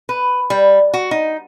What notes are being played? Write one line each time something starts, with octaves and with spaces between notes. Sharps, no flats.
B4
G3
F#4
D#4